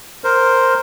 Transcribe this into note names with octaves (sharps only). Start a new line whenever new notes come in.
A#4 C5